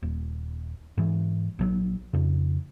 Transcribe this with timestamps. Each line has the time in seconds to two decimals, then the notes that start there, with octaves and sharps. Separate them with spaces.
0.03 D#1
0.98 G#2 E3
1.59 A#1 E3 F#3
2.13 F2 C#3